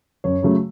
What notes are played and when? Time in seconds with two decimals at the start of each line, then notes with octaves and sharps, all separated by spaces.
0.24 F#2 C#5
0.43 C#3 F#3 A3